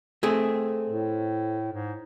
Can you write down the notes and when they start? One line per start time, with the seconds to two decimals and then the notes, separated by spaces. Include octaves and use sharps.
0.23 A3 C4 G#4
0.89 A2
1.72 G#2